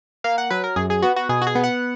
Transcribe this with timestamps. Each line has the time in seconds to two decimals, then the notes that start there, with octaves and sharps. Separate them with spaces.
0.24 A#3 F5
0.38 F#5
0.50 F#3 B4
0.64 A#4
0.76 F#2 G#4
0.90 G#4
1.02 B3 F#4
1.16 F#4
1.29 B2 G#4
1.42 F#4
1.47 G#4
1.55 B3
1.64 F#5